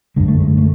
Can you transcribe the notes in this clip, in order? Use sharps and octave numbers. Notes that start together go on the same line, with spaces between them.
F#2 D3 G#3
A3
G#3
A3